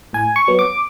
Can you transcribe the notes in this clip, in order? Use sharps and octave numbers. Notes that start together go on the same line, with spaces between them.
A2 G#5
C#6
F#3 B3
D6